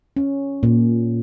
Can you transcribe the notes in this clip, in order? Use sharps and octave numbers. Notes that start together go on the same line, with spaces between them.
C#4
A#2